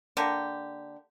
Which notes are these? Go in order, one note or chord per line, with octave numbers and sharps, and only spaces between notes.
D3 A#3 G4